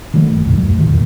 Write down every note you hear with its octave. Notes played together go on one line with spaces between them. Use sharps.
D#3 F#3 A3
G1
B1 F#2 B2
D#1 F#3 A3
E2 A2 D3 D#3
A#2 D#3